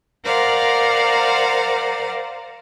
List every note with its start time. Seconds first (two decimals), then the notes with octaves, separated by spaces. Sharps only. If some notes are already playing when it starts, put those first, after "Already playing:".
0.24 A#4 C5 D5 F5 F#5